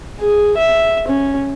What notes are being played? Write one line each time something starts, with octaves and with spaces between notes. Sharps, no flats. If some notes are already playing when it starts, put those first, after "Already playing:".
G#4
E5
C#4